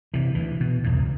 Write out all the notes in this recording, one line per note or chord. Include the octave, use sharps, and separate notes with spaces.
C3 E3
D2 E3
B2
B1 E2 A#2
C#2